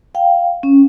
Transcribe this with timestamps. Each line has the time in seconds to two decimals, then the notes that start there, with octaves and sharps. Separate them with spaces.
0.15 F5 G5
0.63 C#4